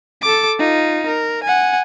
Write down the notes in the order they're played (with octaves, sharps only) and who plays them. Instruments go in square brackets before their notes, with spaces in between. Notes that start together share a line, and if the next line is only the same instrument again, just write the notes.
[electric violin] A4 D6
D#4 F4
A#4
F#5 G#5